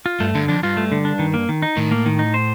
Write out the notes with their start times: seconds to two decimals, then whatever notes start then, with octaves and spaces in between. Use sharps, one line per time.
0.06 F4
0.20 G2 A3
0.35 G2 D3
0.48 F2 D4
0.63 G2 F4
0.77 A3
0.92 D3
1.05 D4
1.19 D#3
1.34 A#3
1.49 D#3
1.62 D#4
1.77 A2 D#3
1.91 A#3
2.06 D#3
2.19 D#4
2.34 C5